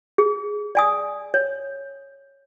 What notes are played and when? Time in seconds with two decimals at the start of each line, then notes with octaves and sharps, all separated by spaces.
0.18 G#4
0.75 D5 G#5 D#6
1.34 C#5